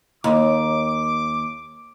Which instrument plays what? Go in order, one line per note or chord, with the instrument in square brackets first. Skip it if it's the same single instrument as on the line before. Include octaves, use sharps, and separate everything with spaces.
[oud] D#2 [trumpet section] D6